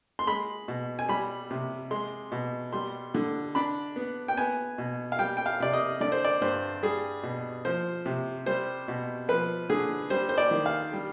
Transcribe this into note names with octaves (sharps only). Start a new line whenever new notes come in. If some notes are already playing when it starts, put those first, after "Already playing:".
C6
G#3 B5
B2
G#5
G3 B5
C3
G#3 C6
B2
G3 C6
D3
D4 B5
B3
G5
B3 G#5
B2
F5
G3 G5
G5
F5
C3 D5
D#5
D3 D5
C5
D5
G2 C5
G3 G#4
B2
F3 C5
C3
G3 C5
B2
F3 B4
D3 G#4
G3 C5
C5
D5
D#3
F5
G3